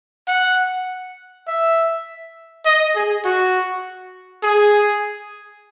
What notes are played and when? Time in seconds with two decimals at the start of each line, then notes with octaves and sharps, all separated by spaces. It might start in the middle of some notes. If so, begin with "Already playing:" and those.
0.28 F#5
1.48 E5
2.66 D#5
2.95 G#4
3.25 F#4
4.43 G#4